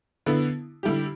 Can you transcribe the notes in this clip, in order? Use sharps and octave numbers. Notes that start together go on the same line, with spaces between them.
D3 B3 E4
D3 G3 E4 G4